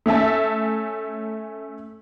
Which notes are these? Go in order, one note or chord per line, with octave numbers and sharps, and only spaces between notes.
A3 C#4 E5 A5